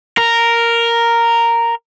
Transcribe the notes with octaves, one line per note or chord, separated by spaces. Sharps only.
A#4